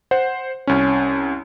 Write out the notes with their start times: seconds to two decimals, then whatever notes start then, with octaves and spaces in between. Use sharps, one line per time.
0.11 C5 F#5
0.67 C2 C#4